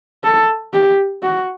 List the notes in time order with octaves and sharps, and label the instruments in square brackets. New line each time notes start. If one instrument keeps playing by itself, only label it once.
[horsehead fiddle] A4
G4
F#4